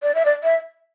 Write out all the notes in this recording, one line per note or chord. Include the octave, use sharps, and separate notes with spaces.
D5
E5
D5
E5